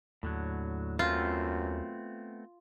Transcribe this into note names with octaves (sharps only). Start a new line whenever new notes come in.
D#2 A2 D3 F#3
F#2 A3 B3 C4 F4